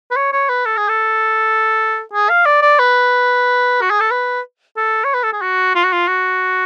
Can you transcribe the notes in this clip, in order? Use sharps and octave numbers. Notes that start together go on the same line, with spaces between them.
B4
C#5
C#5
B4
A4
G#4
A4
G#4
F5
D5
D5
B4
F#4
G#4
A4
B4
A4
C#5
B4
A4
G#4
F#4
F4
F#4
F4
F#4